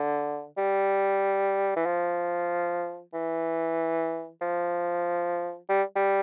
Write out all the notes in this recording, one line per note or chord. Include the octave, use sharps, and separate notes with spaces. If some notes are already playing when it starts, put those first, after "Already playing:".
Already playing: D3
G3
E3
F3
E3
F3
G3
G3